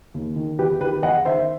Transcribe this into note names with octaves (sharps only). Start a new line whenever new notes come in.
D#2
D#3
E2 G4 B4
D#3 G4 B4
E2 D#5 F#5
D#3 C5 E5